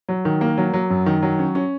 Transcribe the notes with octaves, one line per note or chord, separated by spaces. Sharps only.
F#3
D#3
A#3
F#3
F#3
F#2
D#3
F#3
C#4
C#4